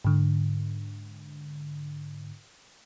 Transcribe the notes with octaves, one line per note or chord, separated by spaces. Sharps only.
G#2 D3